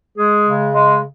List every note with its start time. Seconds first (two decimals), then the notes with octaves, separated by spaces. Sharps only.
0.17 G#3 G#4
0.45 C#3
0.74 G#3